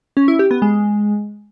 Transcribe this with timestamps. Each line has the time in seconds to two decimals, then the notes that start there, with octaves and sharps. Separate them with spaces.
0.17 C#4
0.28 E4
0.39 G4
0.51 B3
0.62 G#3